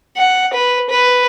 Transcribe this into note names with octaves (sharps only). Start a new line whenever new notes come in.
F#5
B4
B4